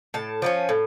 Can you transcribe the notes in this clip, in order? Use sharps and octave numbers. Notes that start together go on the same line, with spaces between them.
A2 A5
F3 A#3 C#4
A2